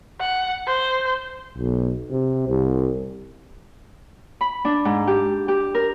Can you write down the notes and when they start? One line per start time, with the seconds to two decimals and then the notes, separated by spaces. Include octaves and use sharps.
0.20 F#5
0.67 C5
1.57 B1
2.11 C3
2.48 C2
4.41 B5
4.65 D4
4.85 G#2
5.07 G4
5.48 G4
5.75 A#4